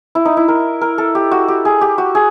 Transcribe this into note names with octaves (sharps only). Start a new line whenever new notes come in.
E4
D#4
E4
A#4
A#4
A4
G4
F#4
G4
G#4
G4
F#4
G#4